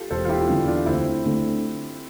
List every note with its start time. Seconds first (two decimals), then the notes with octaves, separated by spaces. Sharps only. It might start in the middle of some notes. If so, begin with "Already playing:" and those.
Already playing: F4 G4 A4
0.10 E1 A4 C5
0.25 F4
0.29 E4 G4
0.49 E2 D3 G3
0.67 D4 F4
0.86 D2 C4 E4
1.25 D3 A3